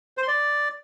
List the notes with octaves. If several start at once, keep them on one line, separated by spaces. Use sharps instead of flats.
C5
C6
D5